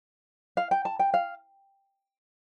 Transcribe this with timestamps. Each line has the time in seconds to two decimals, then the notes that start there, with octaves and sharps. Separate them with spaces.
0.57 F5
0.71 G5
0.85 A5
0.99 G5
1.14 F5